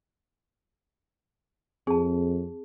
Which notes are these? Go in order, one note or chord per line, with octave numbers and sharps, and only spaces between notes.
F2 C4 G#4 A5